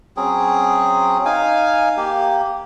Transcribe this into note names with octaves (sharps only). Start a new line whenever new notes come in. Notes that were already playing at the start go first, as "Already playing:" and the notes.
F#3 C4 C#4 G#4
D#4 F5 G#5
A#3 G4